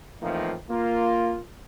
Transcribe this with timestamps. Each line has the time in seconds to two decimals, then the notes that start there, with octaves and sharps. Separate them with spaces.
0.22 A2 E3 F3 A#3 C4 D#4
0.70 A#3 F4